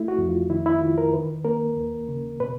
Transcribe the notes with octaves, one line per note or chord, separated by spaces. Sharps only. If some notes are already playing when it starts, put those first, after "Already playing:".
Already playing: A3 E4
F#4
F2
F4
D#3 E4
E4
D#3 F4
A#4
D#3 B4
A#3 A#4
D#2
C#3
B2 B4